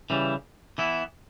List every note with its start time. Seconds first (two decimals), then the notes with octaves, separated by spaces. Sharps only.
0.10 C#3 E3 G3
0.78 E3 B3 E4